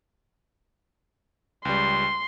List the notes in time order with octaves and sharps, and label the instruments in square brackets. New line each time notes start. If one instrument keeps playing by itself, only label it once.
[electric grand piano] C#2 G3 [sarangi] C6